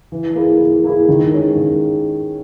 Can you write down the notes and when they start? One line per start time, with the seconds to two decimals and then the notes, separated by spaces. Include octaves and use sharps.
0.12 E3
0.35 A#3 E4 G#4
0.60 E3
0.84 A#3 E4 G#4
1.09 D#3
1.32 G#3 C#4 G#4
1.56 D#3